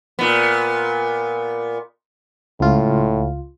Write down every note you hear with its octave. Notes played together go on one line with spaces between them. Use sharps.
A#2 B3
C#2 A2 F4